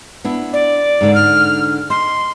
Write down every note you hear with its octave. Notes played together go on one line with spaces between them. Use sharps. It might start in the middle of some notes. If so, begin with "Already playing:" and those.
B3 D4 E4
D5
G#2 D3 D4
F6
D#5 C6